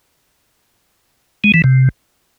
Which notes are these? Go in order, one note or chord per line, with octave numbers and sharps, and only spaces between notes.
G#3
E3
C3